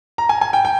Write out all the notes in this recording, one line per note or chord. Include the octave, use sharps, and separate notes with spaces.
A#5
G#5
G#5
G5
G5